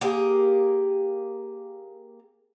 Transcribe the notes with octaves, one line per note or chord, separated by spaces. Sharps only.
A#3 G4 G#4